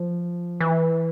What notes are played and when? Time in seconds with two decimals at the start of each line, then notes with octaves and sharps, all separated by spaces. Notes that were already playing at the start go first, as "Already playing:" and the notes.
Already playing: F3
0.60 E3